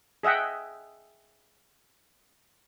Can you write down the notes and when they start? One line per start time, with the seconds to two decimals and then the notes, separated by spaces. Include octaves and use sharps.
0.23 G#4 D#5 E5 F#5 G5